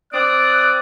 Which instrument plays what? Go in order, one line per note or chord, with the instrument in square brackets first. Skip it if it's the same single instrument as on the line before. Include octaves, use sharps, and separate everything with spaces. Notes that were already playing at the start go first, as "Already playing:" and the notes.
[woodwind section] C4 D5 D#6 [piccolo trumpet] F#6